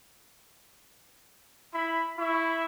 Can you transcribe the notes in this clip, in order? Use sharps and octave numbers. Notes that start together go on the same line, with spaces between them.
E4 B5
E4 B5 C#6